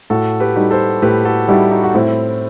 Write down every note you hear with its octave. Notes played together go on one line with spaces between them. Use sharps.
A2 F#4 A4
G4 B4
G3 D#4 F#4
A4 C5
A2 G4 B4
F#4 A4
G3 D#4 E4 F#4 G4
D#4 F#4
F#4
A2 C4 E4